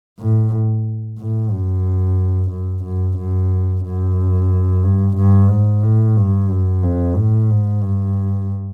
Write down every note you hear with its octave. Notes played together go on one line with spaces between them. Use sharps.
A2
A2
F#2
F#2
F#2
F#2
F#2
G2
G2
G#2
A2
G2
F#2
F2
A2
G#2
G2